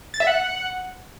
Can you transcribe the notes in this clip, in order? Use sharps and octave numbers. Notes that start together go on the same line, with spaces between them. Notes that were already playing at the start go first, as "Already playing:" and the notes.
A6
E5
F#5